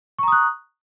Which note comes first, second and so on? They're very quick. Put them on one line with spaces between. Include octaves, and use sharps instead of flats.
C#6 A#5 D#6 F#6